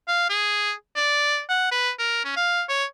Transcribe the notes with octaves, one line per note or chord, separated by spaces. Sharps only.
F5
G#4
D5
F#5
B4
A#4
C#4
F5
C#5